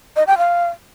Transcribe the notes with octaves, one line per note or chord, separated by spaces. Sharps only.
D#5
G5
F5